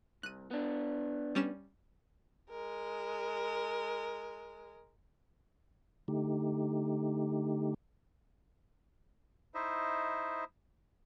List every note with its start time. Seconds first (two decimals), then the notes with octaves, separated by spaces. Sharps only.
0.23 C2 F#6 D#7
0.51 B3 D4
1.35 G3 C#4 E7
2.50 G#3 A#4
6.08 D3 A3 D#4 G4
9.54 D#4 E4 C5 D#5 E5